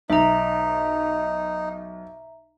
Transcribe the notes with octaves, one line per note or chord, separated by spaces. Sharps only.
B1 D#4 E5 A#5